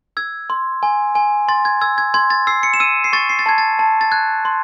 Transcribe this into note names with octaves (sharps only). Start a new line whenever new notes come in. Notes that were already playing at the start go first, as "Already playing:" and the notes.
E6 G#6
C6
G#5
G#5
C6 A6
G#6
E6 G#6
G#6
C6 G#6
A6
E6 C7
C#7
E7
E6 D#7
C7
C#6 A6
C7
A6
A5 G#6
A6
A5
A6
F#6 G#6
C6